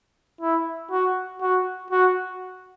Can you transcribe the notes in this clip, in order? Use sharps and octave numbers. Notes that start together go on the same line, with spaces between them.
E4
F#4
F#4
F#4